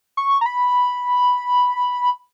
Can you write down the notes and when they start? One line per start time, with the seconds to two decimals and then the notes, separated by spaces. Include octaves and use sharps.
0.17 C#6
0.41 A#5
0.46 B5